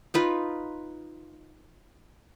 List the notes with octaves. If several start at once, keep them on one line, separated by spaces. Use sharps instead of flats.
D#4 F4 B4